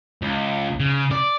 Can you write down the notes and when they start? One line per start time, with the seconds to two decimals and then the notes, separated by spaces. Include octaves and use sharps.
0.22 C#2
0.80 C#3
1.12 D5